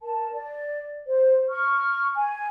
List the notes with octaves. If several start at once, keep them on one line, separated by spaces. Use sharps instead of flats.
A#4 A5
D5
C5
C#6 F6
G#5